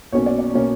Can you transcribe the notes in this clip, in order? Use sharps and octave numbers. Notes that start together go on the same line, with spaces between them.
B1 B2 A#3 C#4 C#5
D5
D5
B2 A#3 C#4